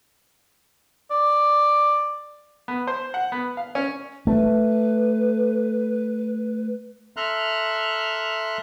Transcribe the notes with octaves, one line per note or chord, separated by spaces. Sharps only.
D5
B3
C5
F#5
B3
F5
C#4
A3 B4
A4 E5 A#5 C6 F6 F#6